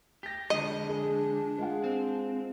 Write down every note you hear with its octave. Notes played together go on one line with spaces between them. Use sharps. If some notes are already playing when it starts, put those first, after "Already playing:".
G4 A#6 B6
D3 F3 G#3 D4 D#5
G#4
G#3 F4 F#5
C4